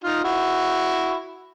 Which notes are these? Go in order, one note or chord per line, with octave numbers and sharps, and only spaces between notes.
D#4 F4
E4 F#4